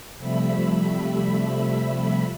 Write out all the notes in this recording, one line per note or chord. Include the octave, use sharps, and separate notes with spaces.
C3 F3 G3 A3 E5 B5